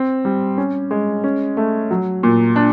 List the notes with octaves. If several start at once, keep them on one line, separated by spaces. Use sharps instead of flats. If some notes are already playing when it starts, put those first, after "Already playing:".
Already playing: C4
G3
C#4
G#3
C#4
A3
F#3
A#2
D4